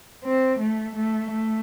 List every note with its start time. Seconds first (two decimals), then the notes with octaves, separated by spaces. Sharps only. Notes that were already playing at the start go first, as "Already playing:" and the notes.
0.24 C4
0.60 A3
0.95 A3
1.31 A3